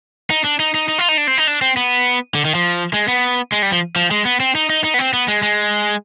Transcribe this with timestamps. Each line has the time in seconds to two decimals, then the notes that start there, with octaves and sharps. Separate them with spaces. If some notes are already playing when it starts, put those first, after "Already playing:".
0.30 D#4
0.44 D4
0.60 D#4
0.74 D#4
0.89 D#4
0.98 F4
1.09 D#4
1.18 D4
1.27 C4
1.38 D#4
1.47 D4
1.62 C4
1.77 B3
2.35 D3
2.45 D#3
2.55 F3
2.94 G#3
3.08 B3
3.52 G#3
3.62 G3
3.72 F3
3.96 F3
4.11 G#3
4.25 B3
4.40 C4
4.55 D#4
4.70 D#4
4.84 D#4
4.94 B3
4.99 C4
5.13 B3
5.28 G#3
5.43 G#3